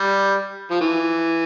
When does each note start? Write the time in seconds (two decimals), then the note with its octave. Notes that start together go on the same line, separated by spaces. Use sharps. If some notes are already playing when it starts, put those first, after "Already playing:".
Already playing: G3
0.71 F3
0.81 E3